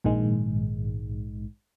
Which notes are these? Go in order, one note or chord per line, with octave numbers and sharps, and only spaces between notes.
A#1 G#2 D#3 G#3